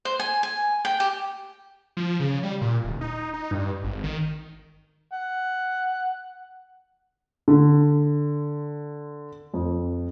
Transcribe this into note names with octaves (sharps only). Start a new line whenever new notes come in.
C5
G#5
G#5
G5
G4
F3
C#3
G3
A#2
D1
D#4
D#4
G2
G#1
D#3
F#5
D3
F2